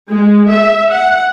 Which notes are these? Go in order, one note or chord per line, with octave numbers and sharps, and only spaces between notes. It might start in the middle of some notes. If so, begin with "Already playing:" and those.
G#3
E5
F#5